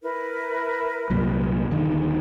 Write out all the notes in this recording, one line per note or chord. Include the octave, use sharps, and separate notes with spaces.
E4 A#4 B4
C2 F#2 A#2
D#1 D3 D#3